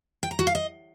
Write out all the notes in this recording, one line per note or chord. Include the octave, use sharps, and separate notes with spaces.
G5
A#5
F#4
F5
D#5